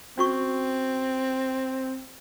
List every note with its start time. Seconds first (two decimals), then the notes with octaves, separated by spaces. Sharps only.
0.18 C4 C#4 F#4 C#6